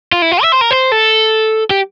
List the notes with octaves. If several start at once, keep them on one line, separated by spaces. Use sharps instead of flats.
F4
E4
F4
E5
C5
A#4
C5
A4
G4